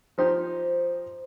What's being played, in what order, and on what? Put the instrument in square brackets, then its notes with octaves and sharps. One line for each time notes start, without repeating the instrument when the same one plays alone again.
[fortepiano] F3 D#4 G4 [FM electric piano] C5